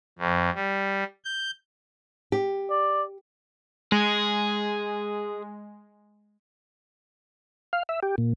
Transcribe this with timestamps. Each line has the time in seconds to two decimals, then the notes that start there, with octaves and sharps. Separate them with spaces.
0.18 F2
0.55 G3
1.24 G6
2.32 G4
2.70 D5
3.92 G#3 G#4
7.73 F5
7.89 E5
8.03 G4
8.18 A#2